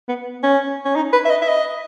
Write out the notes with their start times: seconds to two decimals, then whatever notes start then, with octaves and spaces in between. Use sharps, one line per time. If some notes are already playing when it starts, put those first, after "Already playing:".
0.09 B3
0.43 C#4
0.85 C#4
0.96 D#4
1.13 B4
1.25 E5
1.30 D#5
1.42 E5
1.48 D#5